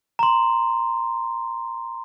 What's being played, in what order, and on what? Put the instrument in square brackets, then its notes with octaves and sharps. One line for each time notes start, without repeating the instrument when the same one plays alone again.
[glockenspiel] A#5 C6